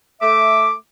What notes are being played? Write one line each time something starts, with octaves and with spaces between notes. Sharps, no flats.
A3 E5 D6